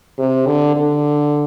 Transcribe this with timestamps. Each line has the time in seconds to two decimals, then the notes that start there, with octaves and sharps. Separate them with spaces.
0.18 C3
0.47 D3
0.76 D3